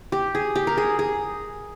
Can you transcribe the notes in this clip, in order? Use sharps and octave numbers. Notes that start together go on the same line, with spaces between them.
G4
G#4
G4
A#4
G#4
G#4